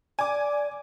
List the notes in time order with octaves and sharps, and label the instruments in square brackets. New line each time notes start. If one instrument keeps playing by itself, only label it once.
[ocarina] D5 [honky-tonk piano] G#5 D6